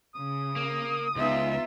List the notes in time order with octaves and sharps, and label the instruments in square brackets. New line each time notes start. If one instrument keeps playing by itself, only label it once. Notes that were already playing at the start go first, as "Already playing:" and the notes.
[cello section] C#3 [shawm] D#6
[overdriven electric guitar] A#3
[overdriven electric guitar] C#2 [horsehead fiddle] B3 E5 [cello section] D#4 F4